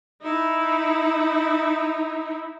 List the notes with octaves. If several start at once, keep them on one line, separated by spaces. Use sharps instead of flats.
D#4 E4